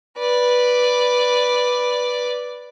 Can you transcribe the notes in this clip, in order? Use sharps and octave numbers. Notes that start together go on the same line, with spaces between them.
B4 D5